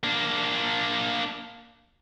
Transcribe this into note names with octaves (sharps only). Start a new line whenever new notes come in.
A#3 D4